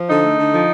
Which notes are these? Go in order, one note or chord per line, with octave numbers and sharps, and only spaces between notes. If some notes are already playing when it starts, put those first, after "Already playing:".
Already playing: F3
D3 D#4
A3
D3
F3